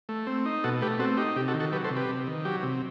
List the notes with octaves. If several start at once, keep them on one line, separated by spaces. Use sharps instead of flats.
A3
C4
D#4
B2 F#4 A4
A3 G4 B4
C4 F#4 A4
D#4 G4
C3 G4
F#4 A4
D#3
F#4 A4
F#3 G4 B4
A4 C5
C3
G4 B4
C3
D#3
F#3 G4
C3